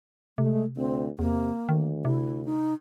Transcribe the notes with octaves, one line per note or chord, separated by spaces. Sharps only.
C3 G#3 A3
D2 C4
E2 C3 A#3
D2 D#3
C3 E4
D#4